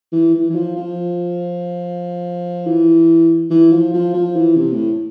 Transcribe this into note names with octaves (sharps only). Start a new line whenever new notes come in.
E3
E3
E3
F3
F3
E3
E3
F3
F3
F3
E3
C3
A2